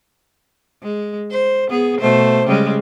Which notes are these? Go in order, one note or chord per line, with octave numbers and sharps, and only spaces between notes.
G#3
C5
B3 G#4
B2 A3 C5
C#3 G3 G#3